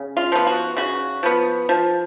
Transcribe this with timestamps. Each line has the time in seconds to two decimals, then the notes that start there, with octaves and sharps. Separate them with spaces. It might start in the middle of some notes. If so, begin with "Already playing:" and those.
Already playing: C#3
0.17 F4
0.32 F3 B3
0.47 F#4
0.77 C#3 F#4
1.23 F3 B3
1.69 F3